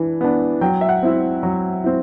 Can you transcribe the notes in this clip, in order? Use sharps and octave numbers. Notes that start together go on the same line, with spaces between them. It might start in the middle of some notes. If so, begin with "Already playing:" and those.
Already playing: E3 D4
B3 D4
F#3 G5
E5
F#5
C4 E4
F#3
C4 E4